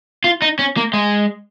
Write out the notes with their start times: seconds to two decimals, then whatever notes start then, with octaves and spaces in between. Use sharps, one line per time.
0.24 F4
0.42 D#4
0.59 C#4
0.77 A#3
0.93 G#3